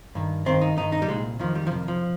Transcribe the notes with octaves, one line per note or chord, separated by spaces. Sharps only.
G2 D#3
G2 D#3 C4
D#4
G2 D#3 D#4
D#4
G3
C2 A#2 G#3
F2 D#3 F3
G3
F3
F2 C3 D#3
F3